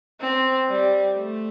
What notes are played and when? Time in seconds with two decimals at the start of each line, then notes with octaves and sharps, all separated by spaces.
0.21 C4
0.68 G3
1.16 A3